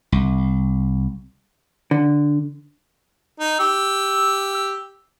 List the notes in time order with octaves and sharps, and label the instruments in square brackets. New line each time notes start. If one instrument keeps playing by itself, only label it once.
[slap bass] C2
[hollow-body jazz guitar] D3
[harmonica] D#4
G4 E6